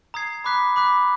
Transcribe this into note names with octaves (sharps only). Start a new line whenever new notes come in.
A#5 D#6 G#6 C7
B5 D6 F#6 B6
B5 D6 F#6 B6